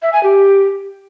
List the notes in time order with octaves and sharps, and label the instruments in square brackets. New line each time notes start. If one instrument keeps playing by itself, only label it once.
[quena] E5
G#5
G4